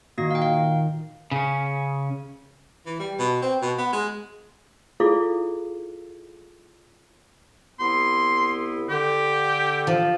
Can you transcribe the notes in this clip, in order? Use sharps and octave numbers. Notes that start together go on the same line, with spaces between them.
A#2 D#3 A#3 F#4 A#6
F5 G5
F5
C#3 C#4
E3
G3
B2
C4
B2
B3
G#3
E4 F4 G#4 A4 D5 F5
C2 B3 E4 C6
D3 G4
F3